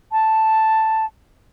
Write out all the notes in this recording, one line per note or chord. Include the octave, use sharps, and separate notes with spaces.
A5